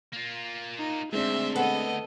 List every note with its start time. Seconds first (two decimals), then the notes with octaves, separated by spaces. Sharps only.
0.12 A#3 F4
0.79 D#4
1.12 D2 G#2 G#3 C4 D4 E5 C6
1.56 B3 A4 D#5